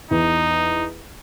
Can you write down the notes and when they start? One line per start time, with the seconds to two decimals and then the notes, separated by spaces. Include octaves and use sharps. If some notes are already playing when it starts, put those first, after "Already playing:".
0.11 E2 D#4